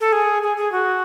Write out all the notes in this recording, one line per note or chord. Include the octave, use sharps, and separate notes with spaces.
A4
G#4
G#4
G#4
F#4